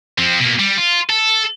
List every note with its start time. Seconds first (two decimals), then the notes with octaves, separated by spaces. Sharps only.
0.18 F3 C4
0.40 B2 A#3
0.59 G3
0.78 F4
1.10 A4